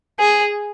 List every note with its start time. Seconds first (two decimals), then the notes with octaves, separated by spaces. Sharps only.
0.19 G#4